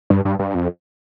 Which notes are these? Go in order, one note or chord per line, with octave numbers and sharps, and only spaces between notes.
G2
G2
G2
F2